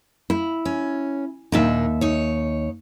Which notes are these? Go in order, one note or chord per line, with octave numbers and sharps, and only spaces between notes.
E4
C#4
D#2 A#2 D4 D#4 E5
D#4 C#5